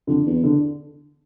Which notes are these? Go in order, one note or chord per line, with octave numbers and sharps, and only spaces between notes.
F2 D3
E2
D3